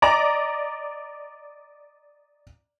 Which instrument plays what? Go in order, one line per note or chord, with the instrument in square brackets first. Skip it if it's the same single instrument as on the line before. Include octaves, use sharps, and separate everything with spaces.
[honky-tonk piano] D5 D#5 A#5